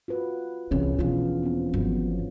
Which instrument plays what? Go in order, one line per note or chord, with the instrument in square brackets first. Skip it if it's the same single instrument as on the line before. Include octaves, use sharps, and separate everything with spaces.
[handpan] F4 F#4 B4
[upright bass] C2 E3 [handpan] C#4 G#4
[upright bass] E1 D4 [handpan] E3 F3 F4
[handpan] B3 C4
[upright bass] G1 F3 [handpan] F#3